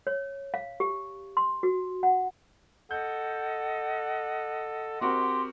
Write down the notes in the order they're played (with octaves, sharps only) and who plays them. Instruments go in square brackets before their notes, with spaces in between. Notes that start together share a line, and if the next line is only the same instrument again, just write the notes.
[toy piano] C#5
F5
G4
C6
F#4
F#5
[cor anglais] A4 [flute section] D#5 F#5 [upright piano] G6
[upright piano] C4 F#4 A#4 [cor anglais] G4 [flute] C6